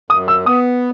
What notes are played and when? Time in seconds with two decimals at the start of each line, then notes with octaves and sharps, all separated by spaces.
0.10 F#2 D#6
0.28 E6
0.46 B3 D#6